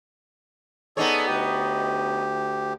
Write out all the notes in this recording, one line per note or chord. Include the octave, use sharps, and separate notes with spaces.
B3 D#4 G#4 A4 C#5 D5
D2 G4